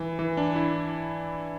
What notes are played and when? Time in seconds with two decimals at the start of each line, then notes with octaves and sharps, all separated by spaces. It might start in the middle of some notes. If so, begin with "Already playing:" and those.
Already playing: E3
0.19 E3
0.37 D4
0.56 E4